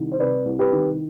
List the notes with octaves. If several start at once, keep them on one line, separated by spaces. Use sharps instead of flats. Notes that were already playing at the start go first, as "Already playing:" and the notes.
Already playing: C2 D#3
C5
C3 B4 D5
C2
G4 B4
D#3